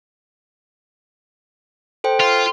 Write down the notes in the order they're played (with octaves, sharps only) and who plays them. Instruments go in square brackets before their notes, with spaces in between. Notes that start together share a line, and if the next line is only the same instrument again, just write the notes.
[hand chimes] A4 C5 G5
[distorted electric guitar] F4